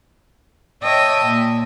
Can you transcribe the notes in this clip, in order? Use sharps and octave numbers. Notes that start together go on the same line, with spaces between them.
C#5 D#5 E5 G5 A5
A#2